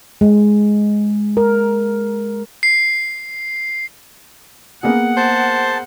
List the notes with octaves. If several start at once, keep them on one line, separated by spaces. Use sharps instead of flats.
G#3
A#4
C7
A#3 B3 G#4 F#5
C5 A5